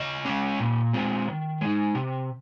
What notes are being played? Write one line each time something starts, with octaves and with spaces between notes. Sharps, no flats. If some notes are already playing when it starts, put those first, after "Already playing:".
Already playing: C#3 D#5
G#3 C#4
A#2
G#3 C4 F4
D#3
G#3 D#4
C3